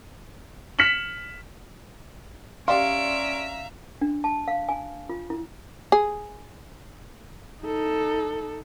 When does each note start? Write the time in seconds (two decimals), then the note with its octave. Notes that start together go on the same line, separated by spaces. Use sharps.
0.79 F6 B6 C#7 E7 F#7
2.68 C#4 G4 D5 E5 F5 A#5 C6 D7
4.01 D4
4.24 A5
4.48 F5
4.69 G#5
5.09 F4
5.30 E4
5.92 G#4
7.62 D#4 A4